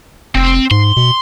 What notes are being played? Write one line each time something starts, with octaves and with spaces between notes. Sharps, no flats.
F1 C4
G#2 C6
B2